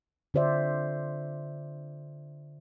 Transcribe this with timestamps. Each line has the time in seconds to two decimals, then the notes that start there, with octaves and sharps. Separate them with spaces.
0.34 D3 F4 C5 D5 E5